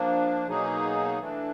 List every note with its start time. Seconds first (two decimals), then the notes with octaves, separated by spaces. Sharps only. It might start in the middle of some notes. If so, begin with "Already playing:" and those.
Already playing: F3 A#3 D4
0.47 B2 F#3 A#3 D#4 G#4
1.18 E3 A3 D4